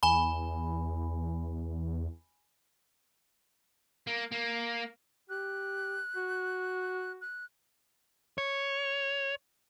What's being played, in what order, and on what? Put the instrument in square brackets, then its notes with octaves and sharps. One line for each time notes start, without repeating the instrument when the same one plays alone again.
[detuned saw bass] E2 [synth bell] G#5 B5
[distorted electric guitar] A#3
A#3
[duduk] G4 [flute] F#6
[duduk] F#4
[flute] F#6
[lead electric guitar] C#5